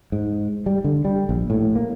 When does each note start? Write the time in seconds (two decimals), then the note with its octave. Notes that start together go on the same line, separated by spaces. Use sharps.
0.12 G#2
0.66 G3
0.84 D3
1.05 G3
1.29 A#1
1.50 A2
1.76 A#3